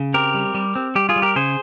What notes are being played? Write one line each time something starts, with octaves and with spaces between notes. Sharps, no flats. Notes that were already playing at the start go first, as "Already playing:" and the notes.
Already playing: C#3
C4 G4 A#4
G3
G3
C4
G3 G4
F4 G#4
G3
G4 A#4
C#3 G#4 C5